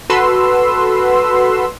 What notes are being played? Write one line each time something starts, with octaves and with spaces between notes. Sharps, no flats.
F#4 A4 B4 C6 E6